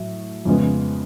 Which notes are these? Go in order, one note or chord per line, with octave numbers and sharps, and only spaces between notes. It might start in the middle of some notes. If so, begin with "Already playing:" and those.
Already playing: A2 F#3
F2 C#3 G#3 B3